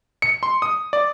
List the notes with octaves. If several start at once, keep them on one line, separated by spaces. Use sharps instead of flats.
C#7
C6
D#6
D5